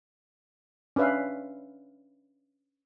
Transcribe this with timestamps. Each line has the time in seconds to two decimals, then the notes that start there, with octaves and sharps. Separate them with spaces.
0.96 C#4 D4 B4 E5 F5